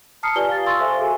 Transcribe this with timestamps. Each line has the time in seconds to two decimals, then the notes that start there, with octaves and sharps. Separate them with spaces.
0.23 A5 A#5 D#6 F6 C7 C#7
0.35 F4 G4 B4 D5 G#5 G7
0.49 F5 A6
0.66 C6 C#6 E6 A6
0.80 A4 C5 E5 F5 G#5
0.99 F#4 G#4 G#5